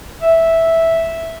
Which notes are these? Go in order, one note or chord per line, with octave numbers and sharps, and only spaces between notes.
E5